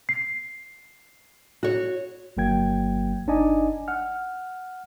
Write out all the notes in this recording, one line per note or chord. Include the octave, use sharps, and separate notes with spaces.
C7
F#4 C#5
G1 F#3 A#3 G5 G#6
G1 D4 D#4 D5 D#5 G#5
F#5 F6